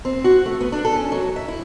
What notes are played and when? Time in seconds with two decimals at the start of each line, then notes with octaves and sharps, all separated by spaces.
0.05 C4
0.24 F#4
0.46 A3
0.60 B3
0.72 D4
0.85 A4
0.96 C#4
1.12 F#3
1.36 E5
1.48 E4